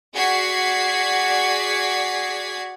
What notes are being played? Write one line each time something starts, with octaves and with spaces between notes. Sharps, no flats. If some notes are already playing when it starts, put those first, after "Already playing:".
F#4 G#4 D5 G#6 B6 C7